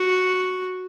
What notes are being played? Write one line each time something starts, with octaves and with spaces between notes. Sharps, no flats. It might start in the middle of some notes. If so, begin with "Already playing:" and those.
Already playing: F#4